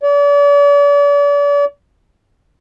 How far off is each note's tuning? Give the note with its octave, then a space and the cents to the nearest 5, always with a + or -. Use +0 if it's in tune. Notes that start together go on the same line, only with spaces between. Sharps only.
D5 -40